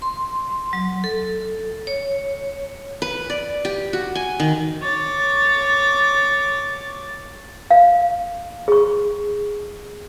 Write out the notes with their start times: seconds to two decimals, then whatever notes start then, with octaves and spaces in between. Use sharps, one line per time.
0.02 C6
0.73 F#3
1.04 A4
1.87 C#5
3.02 B4
3.30 D5
3.65 G4
3.93 F#4
4.15 G#5
4.40 D#3
4.82 C#5 D6 A6
7.71 F5
8.68 G#4 C#6